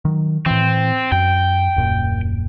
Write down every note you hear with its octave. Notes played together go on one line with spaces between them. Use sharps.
D#3 F#3
A2 E3 C4
F#2 G5
D#1 F#2 A#2